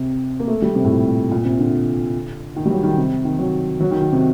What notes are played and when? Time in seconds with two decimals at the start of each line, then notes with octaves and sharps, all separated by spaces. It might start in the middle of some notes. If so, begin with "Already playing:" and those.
Already playing: C3
0.40 A#3
0.48 A3
0.62 G3
0.75 C3
0.85 A2
0.90 A#2
1.32 A#2
1.45 C3
1.59 D3
2.56 D#3
2.66 G3
2.70 F#3
2.83 D#3
2.98 C3
3.25 D#3
3.39 F#3
3.80 F#3
3.91 D#3
4.02 D#3
4.12 C3